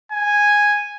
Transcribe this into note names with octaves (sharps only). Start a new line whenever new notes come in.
G#5